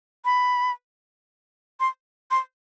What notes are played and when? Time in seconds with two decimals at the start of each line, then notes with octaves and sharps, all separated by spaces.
0.25 B5
1.80 C6
2.31 C6